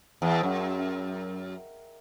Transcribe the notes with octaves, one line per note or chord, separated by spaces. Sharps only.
E2
F#2